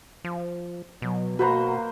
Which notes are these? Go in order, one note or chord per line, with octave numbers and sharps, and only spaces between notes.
F3
B2 F#3
A#3 F#4 B4 C5 A#5